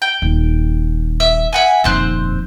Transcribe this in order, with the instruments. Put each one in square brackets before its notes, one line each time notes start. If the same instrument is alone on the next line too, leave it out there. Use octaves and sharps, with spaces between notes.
[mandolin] G5
[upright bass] D#1
[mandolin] E5
E5 F#5 G#5
[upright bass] D#1 F2 [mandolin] C4 C5 F#6